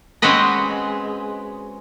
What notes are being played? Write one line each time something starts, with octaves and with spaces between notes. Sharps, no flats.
G#3 C4 C#4 F#4 B4 D#5